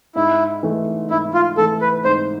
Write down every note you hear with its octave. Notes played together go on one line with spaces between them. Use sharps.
G#2 E4
E3 A3
G#2 E4
F4
E3 A3 A4
B4
G#2 C5